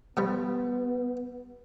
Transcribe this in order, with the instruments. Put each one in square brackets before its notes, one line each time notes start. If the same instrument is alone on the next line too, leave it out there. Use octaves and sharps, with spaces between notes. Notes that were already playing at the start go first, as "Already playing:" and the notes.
[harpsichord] B2 F3 G3 [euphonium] B3